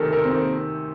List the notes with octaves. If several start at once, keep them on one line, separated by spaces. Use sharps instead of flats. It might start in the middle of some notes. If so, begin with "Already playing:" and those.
Already playing: D2 C3 D#3 A4 A#4
C3 A#4
C4
D#3
A#3